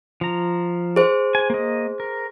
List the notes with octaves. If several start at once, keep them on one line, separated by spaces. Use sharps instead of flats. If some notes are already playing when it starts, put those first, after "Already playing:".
F3 A#5
G#4 C5
G#5
A#3 D#5
A#4